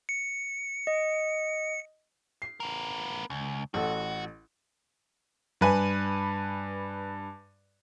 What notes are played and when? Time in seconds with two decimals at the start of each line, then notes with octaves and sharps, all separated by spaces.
0.09 C#7
0.87 D#5
2.42 C7
2.60 B3 A#4
3.30 C#2
3.74 A1 F#4 A4 F#5
5.61 G2 B4 G#5